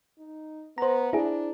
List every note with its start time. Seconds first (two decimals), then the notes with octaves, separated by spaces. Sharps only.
0.18 D#4
0.78 B3 C5 A#5
1.13 D4 E4 G#4